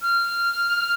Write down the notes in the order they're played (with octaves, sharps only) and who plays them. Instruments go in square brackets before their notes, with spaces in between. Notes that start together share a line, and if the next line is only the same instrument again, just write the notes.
[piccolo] F6